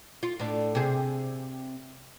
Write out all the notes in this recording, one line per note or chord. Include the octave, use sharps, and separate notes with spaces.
F4
A2 D4
C3 G#4